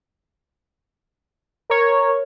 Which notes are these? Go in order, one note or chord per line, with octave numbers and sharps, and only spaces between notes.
A#4 C#5